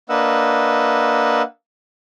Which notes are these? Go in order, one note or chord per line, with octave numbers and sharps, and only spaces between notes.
A#3 D4 B4 D#5 F#5 E6